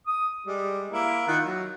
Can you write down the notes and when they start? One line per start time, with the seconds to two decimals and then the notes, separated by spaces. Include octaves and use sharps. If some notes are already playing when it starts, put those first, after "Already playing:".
0.07 D#6
0.46 G3 G#3
0.91 A#3 E4
1.28 D#3 F4 F#5
1.43 F#3